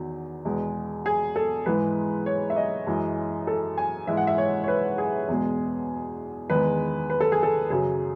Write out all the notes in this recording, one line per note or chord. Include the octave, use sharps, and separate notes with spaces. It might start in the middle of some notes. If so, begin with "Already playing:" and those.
Already playing: E2 D#3 F#3
E2 B2 G#3
G#4
A4
G#2 E3 G#3 B4
C#5
E5
D#5
F#2 E3 G#3
A4
G#5
G#2 E3 G#3 E5
F#5
E5
C#5
C#5
B4
G#4
E2 B2 G#3
E2 D#3 G#3 B4
B4
A4
G#4
A4
F#2 C#3 F#3 G#4